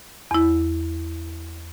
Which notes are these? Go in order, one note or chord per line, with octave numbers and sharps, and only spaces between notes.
E2 E4